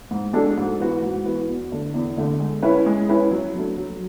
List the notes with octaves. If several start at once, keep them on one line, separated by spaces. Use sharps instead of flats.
G#2
G#3 D4 F#4 A4
G#2
E3 B3 F#4
G#2
E3 B3 F#4
E2
D3 A3 D4
E2
D3 A3 D4
G#3
C#4 E4 B4
G#3
C#4 E4 B4
F#3
A3 D4
F#3